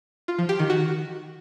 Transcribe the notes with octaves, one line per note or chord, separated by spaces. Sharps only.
F4
F3
G4
D#3
F#4